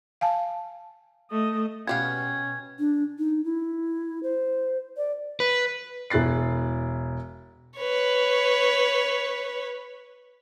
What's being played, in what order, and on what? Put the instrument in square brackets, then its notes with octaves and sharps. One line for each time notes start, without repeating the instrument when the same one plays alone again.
[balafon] F5 G#5 A5
[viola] A3 D#5
[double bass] B2 [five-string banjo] B3 G4 F5 [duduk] C#4 [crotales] G#6
[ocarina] D4
D#4
E4
C5
D5
[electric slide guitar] B4
[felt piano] E1 E4 F#6 A6 C7
[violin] B4 C#5